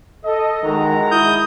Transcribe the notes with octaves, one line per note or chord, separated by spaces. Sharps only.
A4 D#5
D#3 E3 G#3 F#4 A#5
E4 D#6 G6